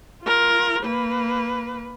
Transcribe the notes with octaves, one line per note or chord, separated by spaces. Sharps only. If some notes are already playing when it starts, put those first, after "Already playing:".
F4 A#4
A#3 B4